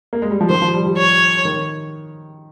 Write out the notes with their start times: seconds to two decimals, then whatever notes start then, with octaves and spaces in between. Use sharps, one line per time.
0.13 A#3
0.22 G#3
0.31 G3
0.41 F3
0.49 D#3 C5
0.62 F3
0.74 G3
0.86 G3
0.98 C#5
1.45 D#3